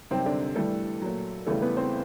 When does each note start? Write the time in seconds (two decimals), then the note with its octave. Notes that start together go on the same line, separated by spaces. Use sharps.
0.11 F#2 C3 D#3 G3 C4
0.26 D3 D4
0.56 G2 E3 G3 A3 A4
1.02 A#2 F#3
1.47 E2 C#3 E3 G3 A3 A4
1.61 B3 B4
1.77 C4 C5